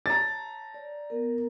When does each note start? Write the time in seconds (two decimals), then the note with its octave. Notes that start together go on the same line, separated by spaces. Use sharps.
0.06 C#5 A5 A#5 A6
0.74 D5
1.10 B3 A#4